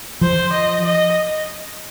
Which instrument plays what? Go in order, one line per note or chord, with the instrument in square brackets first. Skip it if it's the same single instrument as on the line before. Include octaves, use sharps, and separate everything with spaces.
[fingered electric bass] F3 [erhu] C5
[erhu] D#5
D#5